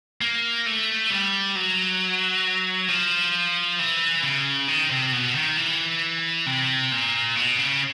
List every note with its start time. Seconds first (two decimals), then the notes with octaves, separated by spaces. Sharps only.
0.21 A#3
0.66 A3
1.10 G3
1.55 F#3
2.88 F3
3.79 E3
4.23 C#3
4.68 D#3
4.91 C3
5.13 B2
5.35 D#3
5.57 E3
6.46 C3
6.92 A#2
7.36 B2
7.59 C#3